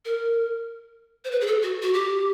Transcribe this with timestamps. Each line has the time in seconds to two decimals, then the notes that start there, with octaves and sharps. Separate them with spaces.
0.05 A#4
1.25 C5
1.31 B4
1.41 G#4
1.46 A4
1.63 F#4
1.82 F#4
1.93 G4